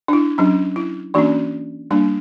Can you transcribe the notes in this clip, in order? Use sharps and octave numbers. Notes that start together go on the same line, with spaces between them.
D4
E4
F#3 C#4 D4
E4
E3 A#3 C#4 D4 F#4
G3 A#3 D4